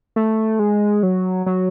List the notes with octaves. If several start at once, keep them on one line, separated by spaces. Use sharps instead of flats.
A3
G#3
F#3
F#3